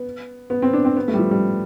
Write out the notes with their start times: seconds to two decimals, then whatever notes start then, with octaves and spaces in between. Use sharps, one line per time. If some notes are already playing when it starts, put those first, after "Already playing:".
Already playing: B3
0.50 B3
0.62 C4
0.73 D4
0.85 C4
0.96 B3
1.08 A3
1.14 G3
1.19 F3
1.31 G3